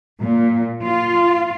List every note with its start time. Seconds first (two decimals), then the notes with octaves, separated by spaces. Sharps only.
0.21 A#2
0.83 F4